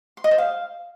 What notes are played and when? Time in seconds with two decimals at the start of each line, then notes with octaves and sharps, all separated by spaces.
0.17 C6
0.24 D#5
0.31 C5
0.38 F5